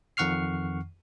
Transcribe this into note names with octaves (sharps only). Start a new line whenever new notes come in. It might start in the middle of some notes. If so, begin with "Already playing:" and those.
F2 D#3 F#5 C#6 F6 C7